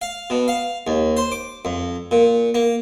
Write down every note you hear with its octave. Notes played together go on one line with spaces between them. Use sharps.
F5
B2
F5
D#2
C5
D6
F2
A#2
A#3